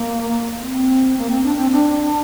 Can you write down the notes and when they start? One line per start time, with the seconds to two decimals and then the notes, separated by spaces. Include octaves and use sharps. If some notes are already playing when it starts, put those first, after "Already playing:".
Already playing: A#3
0.61 C4
1.17 A#3
1.30 C4
1.44 D4
1.57 C4
1.71 D4